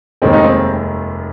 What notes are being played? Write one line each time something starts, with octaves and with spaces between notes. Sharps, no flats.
F1 D#2 D#3 G#3 C4
D#4
C4